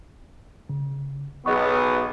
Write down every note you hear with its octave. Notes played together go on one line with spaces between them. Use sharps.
C#3
B1 B3 G#4 D#5 C#6